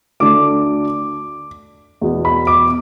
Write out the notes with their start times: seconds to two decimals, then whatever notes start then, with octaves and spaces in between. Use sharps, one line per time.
0.20 D2 D3 A3 D4 D6
2.01 E2 B2 B3
2.25 B5
2.47 D6